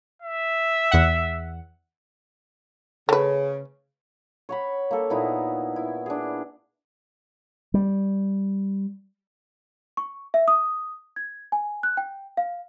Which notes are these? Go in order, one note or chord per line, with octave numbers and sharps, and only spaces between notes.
E5
E2 F#5
C#3 A3 B4
C#5 F#5 B5
A#3 A4
A#2 B3 D#4 E4
E4
D4 G#4
G3
C#6
E5
D#6
G#6
G#5
F#6
G5
F5